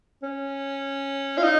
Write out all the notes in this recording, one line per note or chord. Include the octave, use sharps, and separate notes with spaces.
C#4
F4
D#4